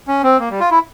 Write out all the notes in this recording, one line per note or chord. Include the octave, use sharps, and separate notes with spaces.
C#4
C4
A#3
G3
F4
E4